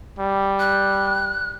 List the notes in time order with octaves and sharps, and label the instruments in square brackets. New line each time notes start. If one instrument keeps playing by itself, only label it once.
[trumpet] G3
[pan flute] F#6